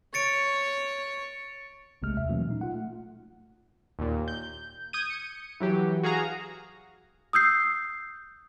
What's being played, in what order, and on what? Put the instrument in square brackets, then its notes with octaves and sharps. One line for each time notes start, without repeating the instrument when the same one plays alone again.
[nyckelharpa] C#5 [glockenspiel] A6 C#7 D7
[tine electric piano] G1 C2 C3 G#3 A3 F6
D#2 E5
B2 E3 F#3 A3 A#3 C#4
A#2 D#4
F4 F#5
A3
[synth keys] D#2 A#2
G6
D#6 G6 G#6 D#7
C#7
E3 F#3 G4
F#4 G#4 F5 A#5
[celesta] D#6 E6 G6 C7